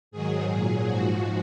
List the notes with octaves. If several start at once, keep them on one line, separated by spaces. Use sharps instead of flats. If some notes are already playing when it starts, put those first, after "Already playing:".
G#2 D#3 F#3 G#4
A#2 F#3
G#2 F3 F#4